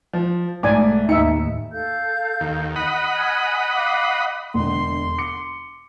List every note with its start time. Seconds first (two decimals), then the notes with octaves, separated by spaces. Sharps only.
0.13 F3
0.63 B1 G#2 G#3 A3 D5 G#5 D6
1.09 D#2 A2 D#4 E5 C#7
1.72 A4 F5 G6
2.40 D#2
2.76 D#5 F#5 B5
3.16 G#5 F6 G#6
3.75 F5 D6
4.54 E1 D3 C6
5.18 D6 C#7